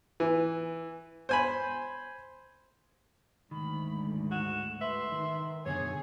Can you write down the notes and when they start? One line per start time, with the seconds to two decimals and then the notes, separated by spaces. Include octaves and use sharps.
0.20 E3
1.29 C5 G#5 B5
3.51 D2 G#2 D#3 B5
4.31 F#4 E7
4.81 B4 E5 C6
5.10 D#3
5.66 F#2 B2 D3 G#4 C#5 G#6